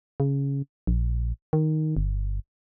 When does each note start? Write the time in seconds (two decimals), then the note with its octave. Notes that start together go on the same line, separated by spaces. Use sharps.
0.20 C#3
0.87 A#1
1.53 D#3
1.97 G1